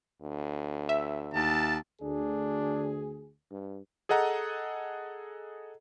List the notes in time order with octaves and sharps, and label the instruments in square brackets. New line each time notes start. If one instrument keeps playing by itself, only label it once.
[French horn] D2
[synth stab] E5
[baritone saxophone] D#2 [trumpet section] A5
[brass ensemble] D2 G#4 [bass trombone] D4
[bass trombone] G2
[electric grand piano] G#4 A4 D#5 F#5 A#5